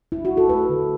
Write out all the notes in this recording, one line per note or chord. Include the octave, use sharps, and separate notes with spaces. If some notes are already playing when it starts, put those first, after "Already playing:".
E4
F#4
A4
A3 B4
D3